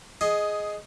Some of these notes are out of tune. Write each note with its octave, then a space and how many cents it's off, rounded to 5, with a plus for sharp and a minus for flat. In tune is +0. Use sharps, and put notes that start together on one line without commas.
G#4 +10 D#5 +0